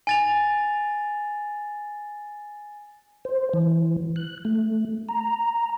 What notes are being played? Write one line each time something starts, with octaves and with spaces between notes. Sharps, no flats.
G#5 A6 F7
C5
E3
F#6
A3
A#5